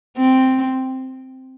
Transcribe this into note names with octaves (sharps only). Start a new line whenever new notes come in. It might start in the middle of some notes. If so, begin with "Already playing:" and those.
C4